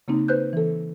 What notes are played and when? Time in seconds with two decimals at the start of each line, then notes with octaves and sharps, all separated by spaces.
0.08 C#3 A#3 C4 D#4
0.28 B4 C5 F#6 G6
0.53 E3 A4